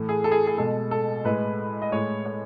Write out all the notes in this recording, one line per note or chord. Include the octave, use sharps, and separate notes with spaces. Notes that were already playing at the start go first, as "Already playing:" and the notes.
Already playing: A2 E3 A3
G#4
A4
G#4
G#4
B2 G#3 A4
A4
A2 G#3 B4
D#5
A2 G#3 C#5
C#5